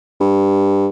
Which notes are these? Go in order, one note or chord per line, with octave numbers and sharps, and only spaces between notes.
G2